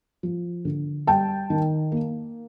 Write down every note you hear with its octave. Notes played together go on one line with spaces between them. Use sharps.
F3
D3
G3 G5 A5
D#3
A#3